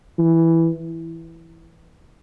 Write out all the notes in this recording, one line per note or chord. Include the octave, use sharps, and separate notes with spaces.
E3